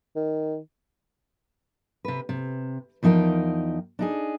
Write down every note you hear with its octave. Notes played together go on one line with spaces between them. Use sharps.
D#3
C3 B4
C3
E2 F3 D#4 A#4 G5
D4 D#4 G#4